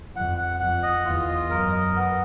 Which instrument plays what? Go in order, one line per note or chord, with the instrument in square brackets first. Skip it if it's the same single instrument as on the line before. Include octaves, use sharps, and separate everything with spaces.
[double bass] F2 [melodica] F#5
[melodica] F#5
[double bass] F2 [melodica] F#5
[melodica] D#5
[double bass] E2 [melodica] F4
[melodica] D#5
[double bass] F#2 [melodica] A#4
[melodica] D#5
B3